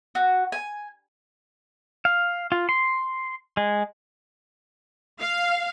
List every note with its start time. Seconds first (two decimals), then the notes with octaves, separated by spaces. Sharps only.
0.15 F#4
0.52 G#5
2.05 F5
2.52 F4
2.69 C6
3.57 G#3
5.21 F5